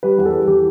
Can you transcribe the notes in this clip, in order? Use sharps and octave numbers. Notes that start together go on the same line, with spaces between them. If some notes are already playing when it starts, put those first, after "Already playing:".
G3 B4
E2
A4
G3
E3 G4